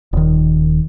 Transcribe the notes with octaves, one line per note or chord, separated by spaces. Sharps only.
D#1 D#3